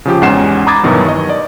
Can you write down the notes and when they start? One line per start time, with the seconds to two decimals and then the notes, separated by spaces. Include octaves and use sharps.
0.05 C#3 F3 G4
0.21 E2 G#2 C#4 F#5 C7 E7
0.67 A#5 B5 D6 D#6 G#6 A6
0.83 G2 B2 D#3 E3 F#3
1.09 D#5
1.29 D5